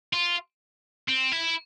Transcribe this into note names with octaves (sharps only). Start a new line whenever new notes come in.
F4
C4
E4